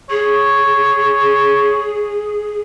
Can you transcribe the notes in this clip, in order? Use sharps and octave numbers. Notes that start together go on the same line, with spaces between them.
G#4 C#5